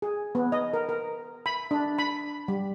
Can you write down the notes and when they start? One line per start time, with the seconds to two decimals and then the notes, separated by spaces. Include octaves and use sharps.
0.02 G#4
0.35 B3
0.52 D#5
0.74 A#4
0.89 A#4
1.46 B5
1.71 D4
1.98 B5
2.48 G3